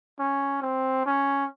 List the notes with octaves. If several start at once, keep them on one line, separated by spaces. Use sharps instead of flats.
C#4
C4
C#4